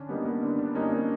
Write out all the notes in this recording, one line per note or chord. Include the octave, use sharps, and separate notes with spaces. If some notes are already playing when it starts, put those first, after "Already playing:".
Already playing: D3 C#4 D4
G3 A#3 B3 D#4
B3
D3
D4
G3 A#3 C#4 D#4
C4